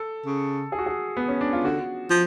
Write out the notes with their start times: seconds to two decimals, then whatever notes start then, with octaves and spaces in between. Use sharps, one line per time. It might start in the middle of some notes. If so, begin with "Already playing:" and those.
Already playing: A4
0.26 C#3
0.72 G#4
0.79 F#4
0.86 G#4
1.17 B3
1.28 C#4
1.41 D4
1.53 F4
1.64 D3 F#4
2.10 F3